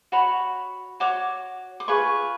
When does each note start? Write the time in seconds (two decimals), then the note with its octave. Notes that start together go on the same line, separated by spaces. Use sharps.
0.12 F#4 C#5 B5
1.00 F#4 C#5 D6
1.80 D6
1.88 F4 G#4 B4 C#6